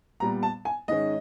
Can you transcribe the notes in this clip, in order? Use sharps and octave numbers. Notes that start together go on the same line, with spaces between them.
A#2 G3 B3 A#5
A5
G#5
G#2 D#3 G#3 C#4 D#5